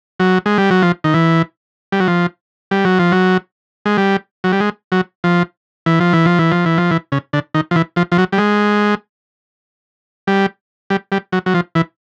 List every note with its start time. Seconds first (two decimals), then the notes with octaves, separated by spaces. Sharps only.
0.20 F#3
0.46 G#3
0.58 G3
0.71 F#3
0.82 F3
1.04 D#3
1.14 E3
1.92 G3
2.00 F#3
2.08 F3
2.71 G3
2.85 F#3
2.99 F3
3.12 F#3
3.86 G#3
3.98 G3
4.44 F#3
4.52 G3
4.60 G#3
4.92 F#3
5.24 F3
5.86 E3
6.00 F3
6.13 E3
6.25 F3
6.39 E3
6.52 F3
6.65 E3
6.78 F3
6.91 E3
7.12 C#3
7.33 D3
7.54 D#3
7.71 F3
7.76 E3
7.96 F3
8.12 F3
8.18 F#3
8.32 G3
8.38 G#3
10.27 G3
10.90 G3
11.12 G3
11.32 F#3
11.46 F#3
11.54 F3
11.75 E3